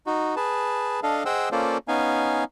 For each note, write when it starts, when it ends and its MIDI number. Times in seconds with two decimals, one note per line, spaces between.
0.06 0.35 63
0.06 0.35 66
0.36 1.00 68
0.36 1.00 71
0.36 1.00 81
1.03 1.23 62
1.03 1.23 69
1.03 1.23 75
1.03 1.23 77
1.25 1.49 68
1.25 1.49 72
1.25 1.49 75
1.25 1.49 78
1.25 1.49 79
1.25 1.49 88
1.52 1.78 58
1.52 1.78 61
1.52 1.78 65
1.52 1.78 69
1.52 1.78 72
1.52 1.78 74
1.88 2.44 59
1.88 2.44 61
1.88 2.44 63
1.88 2.44 77
1.88 2.44 80